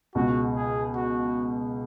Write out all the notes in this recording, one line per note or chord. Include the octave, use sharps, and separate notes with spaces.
C#2 B2 G#3 F#4
G#4
F#4